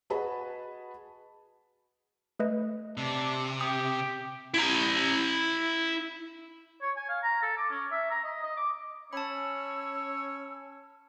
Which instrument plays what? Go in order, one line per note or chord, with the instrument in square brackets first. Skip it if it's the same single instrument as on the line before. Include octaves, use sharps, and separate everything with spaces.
[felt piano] F#4 G#4 B4 D#5 A5 B5
[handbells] A3 B4 D#5
[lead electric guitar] C3 [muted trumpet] D4
[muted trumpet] G4 [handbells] D#6
[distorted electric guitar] E4 A#5
[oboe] C#5
G#5
F5
A#5
A4
D6
C#4
E5
A#5
D#5
D#5
D6
[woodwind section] C#4 C#5 E6 [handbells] A5 B5